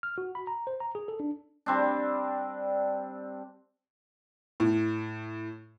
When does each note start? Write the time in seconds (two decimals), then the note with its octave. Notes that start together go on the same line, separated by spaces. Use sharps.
0.03 F6
0.18 F#4
0.35 B5
0.47 A#5
0.67 C5
0.80 A#5
0.95 G#4
1.08 A4
1.20 D4
1.66 G3 C4 D4
4.60 A2